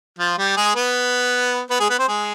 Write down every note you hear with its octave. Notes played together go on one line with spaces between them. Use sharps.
F3 F4
G3 G4
G#3 G#4
B3 B4
B3 B4
G#3 G#4
B3 B4
C4 C5
G#3 G#4